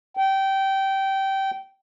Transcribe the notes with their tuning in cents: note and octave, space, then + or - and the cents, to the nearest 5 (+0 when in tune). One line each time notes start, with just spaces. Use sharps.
G5 -20